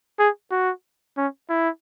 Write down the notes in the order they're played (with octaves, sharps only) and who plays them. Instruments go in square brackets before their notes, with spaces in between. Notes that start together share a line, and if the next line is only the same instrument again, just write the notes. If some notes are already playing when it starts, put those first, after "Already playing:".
[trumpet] G#4
F#4
C#4
E4